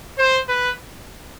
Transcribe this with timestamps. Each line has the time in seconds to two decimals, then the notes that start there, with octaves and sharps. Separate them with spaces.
0.18 C5
0.49 B4